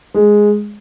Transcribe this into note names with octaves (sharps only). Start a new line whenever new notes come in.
G#3